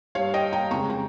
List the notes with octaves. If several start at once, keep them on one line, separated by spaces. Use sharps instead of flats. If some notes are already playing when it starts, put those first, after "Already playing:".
G2 G3 C#5 F5
D#5 G5
G5 A#5
F2 C#3 G#3 A#5 C#6
G5 A#5